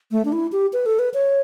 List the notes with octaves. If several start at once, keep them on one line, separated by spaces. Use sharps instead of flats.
A3
D4
E4
G4
B4
A4
B4
C#5